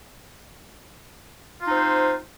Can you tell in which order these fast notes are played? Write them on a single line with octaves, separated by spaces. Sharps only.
F4 D#4 C4 C5